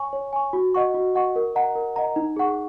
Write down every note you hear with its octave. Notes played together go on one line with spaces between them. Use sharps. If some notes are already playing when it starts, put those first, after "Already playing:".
Already playing: C#5 G#5 C#6
C#5
G#5 C#6
F#4
D#5 F#5 C#6
F#4
D#5 F#5 C#6
A#4
D#5 F#5 A#5
A#4
D#5 F#5 A#5
D#4
G#4 F#5 C#6